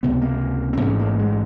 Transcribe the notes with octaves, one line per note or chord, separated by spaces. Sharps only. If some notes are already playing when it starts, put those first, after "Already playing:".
C#2 C3 B3
A#3
C4
A1 G#2 C#4
A#3
G#3